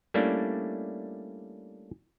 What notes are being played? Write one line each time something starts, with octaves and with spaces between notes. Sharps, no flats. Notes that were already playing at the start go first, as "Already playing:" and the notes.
G3 A3 A#3 C#4 D4 E4